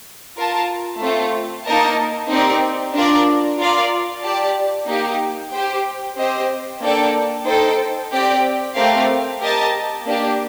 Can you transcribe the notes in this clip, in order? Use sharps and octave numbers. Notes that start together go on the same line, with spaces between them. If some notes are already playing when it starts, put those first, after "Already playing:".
F4 A#4 F5 A5
A3 C4 F4
A#3 D#4 A#4 D#5 A5
C4 D#4 G4 A#4 D5
D4 F4 A#4 D5
F4 A#4 D5 F5
G4 D5 A5
A#3 D#4 G4
G4 C5 G5
C4 G4 C5 D#5
A#3 D4 A4 D5 G5
D#4 A4 C5 G5
C4 G4 D5 G5
A3 C4 G4 A#4 F5
G4 A#4 D#5 A5
A#3 D4 G4